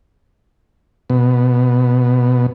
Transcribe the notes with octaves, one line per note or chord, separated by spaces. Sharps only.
B2